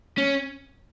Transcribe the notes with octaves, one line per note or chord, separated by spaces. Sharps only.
C#4